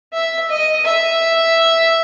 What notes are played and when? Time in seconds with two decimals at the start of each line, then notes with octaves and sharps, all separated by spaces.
0.13 E5
0.49 D#5
0.85 E5